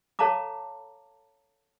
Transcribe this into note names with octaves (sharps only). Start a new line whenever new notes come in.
A4 C#5 F5 A5 A#5 D6